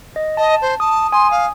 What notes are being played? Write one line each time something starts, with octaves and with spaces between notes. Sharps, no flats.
D#5
D#5 A5
C5
A5 D#6
G#5 C6 D#6
F5